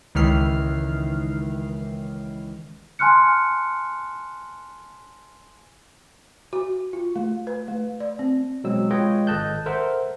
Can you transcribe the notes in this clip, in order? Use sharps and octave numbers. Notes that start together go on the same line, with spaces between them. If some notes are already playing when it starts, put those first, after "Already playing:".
C#2 D#3 E3 F6 C7
G#5 A5 C6 F6 F#6 C#7
F#4
F4
A3
B4
A3
D5
C4
B2 F#3 G#3 C4 E6
G#3 F4 B4 C#5 D#5 G5
G#1 A4 D#5 A5 F#6 G6
A4 A#4 C5 E5 F#5